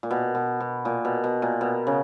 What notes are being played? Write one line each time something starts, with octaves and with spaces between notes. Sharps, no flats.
A#2
B2
B2
B2
A#2
B2
B2
A#2
B2
C#3